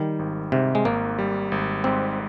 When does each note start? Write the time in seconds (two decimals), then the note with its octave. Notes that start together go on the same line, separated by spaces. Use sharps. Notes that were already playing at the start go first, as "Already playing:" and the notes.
Already playing: D#3 G3
0.19 G#1
0.52 G#2 C3
0.75 G#3
0.85 G#1 A#3
1.18 G3
1.52 G#1
1.84 G#2 C4